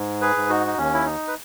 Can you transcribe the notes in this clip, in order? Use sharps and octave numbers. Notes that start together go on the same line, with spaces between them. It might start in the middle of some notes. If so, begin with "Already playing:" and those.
Already playing: G#2
G#4 B4
G#2
D#4 F#4
D#4
D#2 C#4
E4
D#4
B4